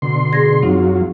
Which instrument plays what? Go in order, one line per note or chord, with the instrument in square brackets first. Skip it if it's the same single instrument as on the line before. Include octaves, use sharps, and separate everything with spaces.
[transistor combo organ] B2 D3 C6
[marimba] G#4 G#6 A#6
[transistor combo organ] F#2 F#3 F4 [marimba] C4 D#4